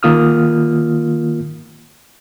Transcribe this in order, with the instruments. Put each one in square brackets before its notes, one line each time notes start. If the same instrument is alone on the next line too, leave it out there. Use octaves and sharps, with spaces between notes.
[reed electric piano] D#3 A#3 F4 D#6 F6